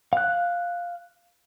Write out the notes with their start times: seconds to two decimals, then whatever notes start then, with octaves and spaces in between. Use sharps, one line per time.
0.13 F5 F#6